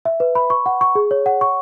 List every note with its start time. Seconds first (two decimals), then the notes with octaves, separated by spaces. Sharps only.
0.05 E5
0.20 B4
0.35 B5
0.50 C#6
0.66 F#5
0.81 C#6
0.95 G#4
1.11 C#5
1.26 F#5
1.41 C#6